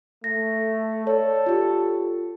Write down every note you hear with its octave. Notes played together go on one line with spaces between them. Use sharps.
A3 A#6
A4 C#5 D5
F4 G4